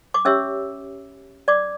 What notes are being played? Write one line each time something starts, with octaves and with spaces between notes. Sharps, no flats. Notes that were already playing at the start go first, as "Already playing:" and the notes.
D6
C#4 G4 C#5 E5 E6
D5 D6